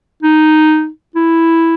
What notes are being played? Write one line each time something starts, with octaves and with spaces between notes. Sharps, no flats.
D#4
E4